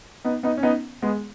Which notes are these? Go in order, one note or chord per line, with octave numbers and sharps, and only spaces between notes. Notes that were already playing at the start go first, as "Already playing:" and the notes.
B3 D#4
B3 D#4
C#4
B3 D#4
G#3 B3